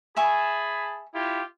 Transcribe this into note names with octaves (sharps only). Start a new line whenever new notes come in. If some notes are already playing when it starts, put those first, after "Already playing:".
G#4 E5 G#5 A5 B5 C#6
E4 F4 G4